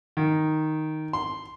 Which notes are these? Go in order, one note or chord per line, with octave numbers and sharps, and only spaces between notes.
D#3
C6